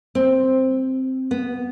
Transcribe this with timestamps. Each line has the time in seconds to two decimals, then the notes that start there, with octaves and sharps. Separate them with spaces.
0.15 C4
1.31 B3